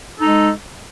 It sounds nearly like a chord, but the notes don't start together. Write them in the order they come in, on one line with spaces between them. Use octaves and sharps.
A4 D#4 G#3